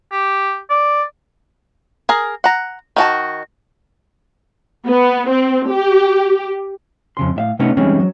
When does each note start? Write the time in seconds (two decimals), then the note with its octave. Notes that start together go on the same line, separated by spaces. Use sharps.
0.12 G4
0.70 D5
2.09 G#4 A#4
2.44 F#5 A#5
2.96 D#3 F#4 A5
4.87 B3
5.29 C4
5.69 G4
7.17 F2 C#3 C6
7.36 A2 E5 F5
7.59 C3 A3 B3 C#4 D#4 C#5
7.77 E3 G3 G#3 C4 C#4 D#4
8.00 F#3